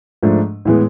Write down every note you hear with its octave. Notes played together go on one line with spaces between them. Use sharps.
G#2 F3 A3 D4
A2 E3 G#3 B3